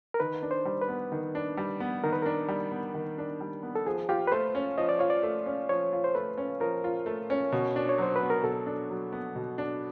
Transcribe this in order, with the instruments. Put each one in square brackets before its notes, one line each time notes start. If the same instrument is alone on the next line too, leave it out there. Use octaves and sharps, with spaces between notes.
[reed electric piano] A#4
[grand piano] D#3 [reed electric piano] B4
[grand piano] D4
[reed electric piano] C5
[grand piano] G3
[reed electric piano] B4
[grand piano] B3
D#3
D4
G3
B3
[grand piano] D#3 [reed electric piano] A#4
[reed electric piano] B4
[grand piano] D4 [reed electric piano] A#4
[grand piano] G3
B3
D#3
D4
G3
B3
[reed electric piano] A4
[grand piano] F3 [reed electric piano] G#4
[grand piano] F4 [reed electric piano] G4
[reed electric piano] B4
[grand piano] A3 [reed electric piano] C5
[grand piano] C#4
[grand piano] F3 [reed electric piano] D#5
[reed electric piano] D5
[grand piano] F4 [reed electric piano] C#5
[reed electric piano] D5
[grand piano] A3
C#4
[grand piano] F3 [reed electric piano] C#5
[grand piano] F4
[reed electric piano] C5
[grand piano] A3 [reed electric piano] B4
[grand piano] C#4
[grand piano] F3 [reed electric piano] A#4
[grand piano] F4
A3
C#4
B2
D4
[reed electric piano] C#5
[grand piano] F#3 [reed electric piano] C5
[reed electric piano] B4
[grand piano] B3
[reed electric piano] A#4
[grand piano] B2 [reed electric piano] A4
[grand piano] D4
F#3
B3
B2
D4